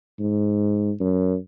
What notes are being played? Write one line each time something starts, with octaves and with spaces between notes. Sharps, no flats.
G#2
F#2